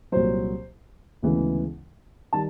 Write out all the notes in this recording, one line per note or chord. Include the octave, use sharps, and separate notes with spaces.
C2 A#2 F#3 C5
D2 C#3 E3 G#3 B3
D#3 G3 A5